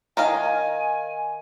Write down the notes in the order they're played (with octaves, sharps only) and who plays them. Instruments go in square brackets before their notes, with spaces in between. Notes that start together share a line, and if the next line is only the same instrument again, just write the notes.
[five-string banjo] D#3 D#5 F5 [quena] G#5